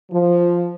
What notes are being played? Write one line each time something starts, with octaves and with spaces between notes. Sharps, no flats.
F3